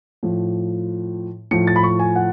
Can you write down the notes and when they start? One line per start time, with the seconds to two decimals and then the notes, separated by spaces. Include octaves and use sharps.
0.23 A2 F3
1.51 A2 F3 C#7
1.67 A6
1.76 B5
1.84 C#6
1.99 G#5
2.16 F#5